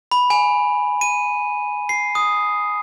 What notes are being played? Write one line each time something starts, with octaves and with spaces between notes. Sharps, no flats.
B5
G#5
D#7
C7
D#6